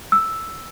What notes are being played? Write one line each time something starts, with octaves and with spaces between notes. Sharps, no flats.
E6